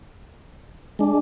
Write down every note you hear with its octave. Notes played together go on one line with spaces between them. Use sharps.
G#3 D4